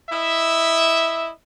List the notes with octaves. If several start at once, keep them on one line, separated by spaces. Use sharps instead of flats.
E4 D#5 E5